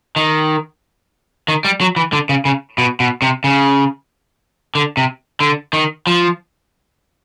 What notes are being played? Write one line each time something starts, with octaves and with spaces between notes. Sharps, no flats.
D#3
D#3
G3
F#3
E3
D3
C#3
C#3
B2
B2
C3
C#3
D3
C3
D3
D#3
F3